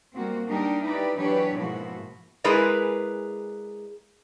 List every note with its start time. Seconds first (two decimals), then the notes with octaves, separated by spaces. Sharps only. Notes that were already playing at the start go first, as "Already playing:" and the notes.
0.14 G3 A#3 C4 F#4
0.47 G3 D4 D#4 G4 A#4
0.84 D#4 E4 G4 B4 D5
1.16 E3 F#3 D4 G4 B4 C#5
1.57 G#2 B2 F3 A#3 E4 F#4
2.44 G#3 E4 G#4 A#4 B4 D5